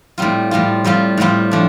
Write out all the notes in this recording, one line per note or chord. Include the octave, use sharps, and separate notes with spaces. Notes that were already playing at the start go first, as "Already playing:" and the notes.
A2 G3 C4 F4
A2 G3 C4 F4
A2 G3 C4 F4
A2 G3 C4 F4
F3 A3 D4